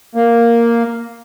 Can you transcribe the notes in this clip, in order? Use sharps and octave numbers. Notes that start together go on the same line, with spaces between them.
A#3